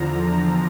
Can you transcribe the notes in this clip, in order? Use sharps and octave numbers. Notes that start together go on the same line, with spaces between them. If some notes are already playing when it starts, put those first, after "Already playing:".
Already playing: E2 D3 F3 A#5